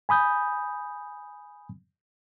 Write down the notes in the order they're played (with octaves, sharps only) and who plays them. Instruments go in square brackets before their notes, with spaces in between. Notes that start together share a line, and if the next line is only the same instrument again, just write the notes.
[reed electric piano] G#5 B5 D#6 G6